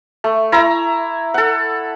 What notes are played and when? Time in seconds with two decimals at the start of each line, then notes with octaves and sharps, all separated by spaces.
0.24 A3
0.52 E4 A#5
1.34 A4 F#5